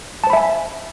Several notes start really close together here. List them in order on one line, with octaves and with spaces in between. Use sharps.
A5 C5 B5 E5 G#5